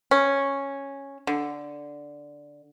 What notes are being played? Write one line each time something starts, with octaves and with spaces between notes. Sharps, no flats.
C#4
D3